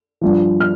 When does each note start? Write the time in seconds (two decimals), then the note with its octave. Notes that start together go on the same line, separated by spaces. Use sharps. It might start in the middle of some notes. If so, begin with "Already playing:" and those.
0.21 G2 F3
0.60 F6